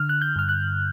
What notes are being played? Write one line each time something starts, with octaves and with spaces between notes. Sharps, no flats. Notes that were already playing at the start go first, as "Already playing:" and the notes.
Already playing: D3 F6
F#6
G6
G2 F6
F#6